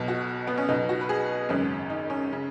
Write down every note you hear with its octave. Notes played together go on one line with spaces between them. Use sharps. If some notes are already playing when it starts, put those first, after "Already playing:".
Already playing: B1 B2
F#4
B3
C#4
B1 B2 D#4
F#4
B4
G#4
G#1 F#2 C#3 C#4
D#4
C#4
C#3